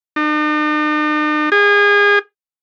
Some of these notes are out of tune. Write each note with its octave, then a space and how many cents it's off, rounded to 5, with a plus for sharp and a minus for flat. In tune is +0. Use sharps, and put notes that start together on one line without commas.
D#4 -45
G#4 -30